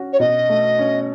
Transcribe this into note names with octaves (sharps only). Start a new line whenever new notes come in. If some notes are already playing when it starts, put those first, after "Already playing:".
Already playing: C#4 F#4
C#5
B2 D#5
A3
C#4